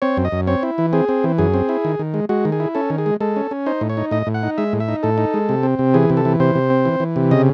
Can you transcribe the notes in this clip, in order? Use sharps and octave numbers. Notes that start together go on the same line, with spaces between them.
C4 C#5
F#2
D#5
F#2
C4 C#5
E4
E3
C4 G#4
C4
E3
F#2 G#4
C4
E4
D#3
D#3
G#3
G#3 F#4
D#3
G#4
E4
C#4 A4
D#3
G#4
G#3
G#3 A4
C#4
C#4
D#4 C5
A2
C#5
D#4
A2 D#5
A2
F#5
D#4
G#3 E5
A2
E5
D#4
A2 A4
D#4
G#3
C3
C4
C3
E3 G#4
C3
A4
E3
C3 C5
C3
C4
E3
E3
C3
C#3 D#5